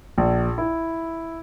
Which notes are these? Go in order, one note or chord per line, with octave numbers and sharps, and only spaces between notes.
A#1
E4